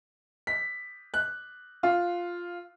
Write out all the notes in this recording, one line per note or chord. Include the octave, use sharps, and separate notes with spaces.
B6
F#6
F4